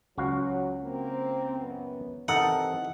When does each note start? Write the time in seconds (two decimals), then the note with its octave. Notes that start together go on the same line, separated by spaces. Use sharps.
0.18 C#2 F#3 F#4 F5
0.84 A#3 C4
1.59 F#2 B3
2.28 C3 E3 D#4 A4 A#4 F#5